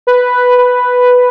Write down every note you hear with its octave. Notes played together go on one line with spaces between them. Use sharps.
B4
B4